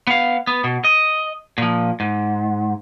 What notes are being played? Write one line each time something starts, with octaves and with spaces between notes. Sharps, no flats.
B3 F5
B3
B2
D#5
A#2 F3
G#2